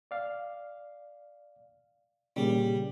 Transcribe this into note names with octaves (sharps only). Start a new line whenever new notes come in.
D5 F5
A#2 C#3 G3